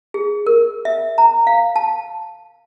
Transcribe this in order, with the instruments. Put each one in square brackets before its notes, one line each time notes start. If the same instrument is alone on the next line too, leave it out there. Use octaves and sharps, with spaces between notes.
[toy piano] G#4
A#4
E5
A#5
F5
A5